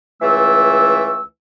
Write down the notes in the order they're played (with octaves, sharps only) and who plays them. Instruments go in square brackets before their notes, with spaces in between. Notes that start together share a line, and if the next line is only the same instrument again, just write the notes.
[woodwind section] C#2 E3 A3 E6